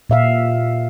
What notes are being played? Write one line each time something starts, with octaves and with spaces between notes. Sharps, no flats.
A#2 E5 F5